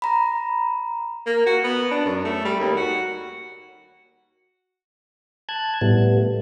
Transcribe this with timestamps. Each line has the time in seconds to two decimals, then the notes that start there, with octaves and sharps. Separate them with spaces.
0.02 A#5 B5
1.26 A#3
1.46 F#4
1.64 B3
1.91 D4
2.05 F#2
2.25 A3
2.45 G3
2.60 D#2
2.76 F#4
5.49 A5 F#6 G#6
5.81 A2 G3 A3 B3